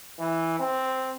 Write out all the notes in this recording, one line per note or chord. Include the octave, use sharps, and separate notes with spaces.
E3
C4